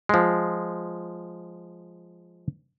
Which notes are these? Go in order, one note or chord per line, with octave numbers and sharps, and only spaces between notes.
F3 G#3